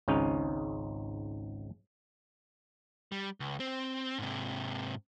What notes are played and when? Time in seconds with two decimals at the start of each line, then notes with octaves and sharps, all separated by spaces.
0.08 G#1 C#2 G#2 C#4 D#4
3.12 G3
3.40 C#2
3.60 C4
4.18 G#2 C3